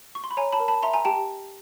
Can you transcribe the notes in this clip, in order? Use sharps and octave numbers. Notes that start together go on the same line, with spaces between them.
C#6
C6
B5
C#5 G#5 A#5
A5 B5
A#4
A5 B5
E5 A#5 C6
G#5 A#5
G4 G5 A5